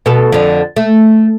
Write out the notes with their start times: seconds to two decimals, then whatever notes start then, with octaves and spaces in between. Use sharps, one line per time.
0.06 B2 A4
0.32 F2 D3
0.76 A3